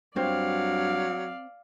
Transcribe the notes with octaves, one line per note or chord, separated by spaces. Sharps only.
G2 F#3 C4 C#5 D5 F5